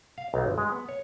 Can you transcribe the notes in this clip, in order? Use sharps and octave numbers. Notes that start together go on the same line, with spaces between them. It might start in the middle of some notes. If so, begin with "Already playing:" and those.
F5
B1
G1
G#3
B3
C#5